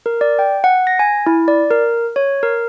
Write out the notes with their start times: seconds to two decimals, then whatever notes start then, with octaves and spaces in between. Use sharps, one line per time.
0.06 A#4
0.21 D5
0.39 G5
0.64 F#5
0.87 A#6
0.99 G#5
1.26 E4
1.48 D5
1.71 A#4
2.16 C#5
2.43 A#4